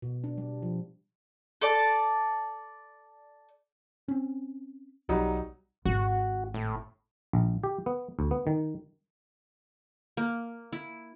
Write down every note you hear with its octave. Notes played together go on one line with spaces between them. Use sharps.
B2
D4
G3
F3
A4 D5 A5
C4 C#4
B1 F#3 G3 D#4
G#1 F#4
A2
A#1
G4
B3
D2
B3
D#3
A#3
E4